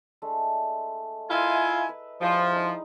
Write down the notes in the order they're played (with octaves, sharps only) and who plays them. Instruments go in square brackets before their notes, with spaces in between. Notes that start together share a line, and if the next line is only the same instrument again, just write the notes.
[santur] G#3 A3 D4
[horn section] E4 F4 G#5 [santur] A#4 D#5 E5
[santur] B4
[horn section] F3 [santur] G3 G#3 E4
[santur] G#3 D#4